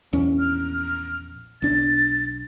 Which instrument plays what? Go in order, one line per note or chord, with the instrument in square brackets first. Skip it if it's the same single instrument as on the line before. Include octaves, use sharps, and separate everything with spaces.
[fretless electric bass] A#1 E2 C#4
[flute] F6
[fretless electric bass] B1 D4 [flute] A6